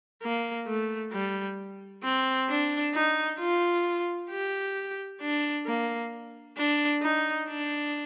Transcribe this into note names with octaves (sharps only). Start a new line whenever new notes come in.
A#3
A3
G3
C4
D4
D#4
F4
G4
D4
A#3
D4
D#4
D4